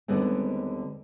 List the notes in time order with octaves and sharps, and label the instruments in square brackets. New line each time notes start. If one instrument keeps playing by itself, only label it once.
[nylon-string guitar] D#2 D3 G3 G#3 B3 C4